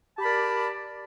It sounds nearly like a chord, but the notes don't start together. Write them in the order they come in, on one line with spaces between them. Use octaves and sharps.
G4 A5 B5 D5 A#4